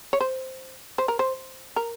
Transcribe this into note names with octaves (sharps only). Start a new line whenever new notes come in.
C#5
C5
C5
A#4
C5
A#4